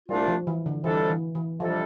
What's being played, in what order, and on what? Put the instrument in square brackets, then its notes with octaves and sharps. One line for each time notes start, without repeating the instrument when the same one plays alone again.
[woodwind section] C2 A#2 A3 D4 F4 [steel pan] G3
[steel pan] F3
E3
D3
[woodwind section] F2 C3 G3 D4 A4 [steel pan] E3
[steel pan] E3
E3
[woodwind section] F2 C3 G3 D4 A4 [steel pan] F3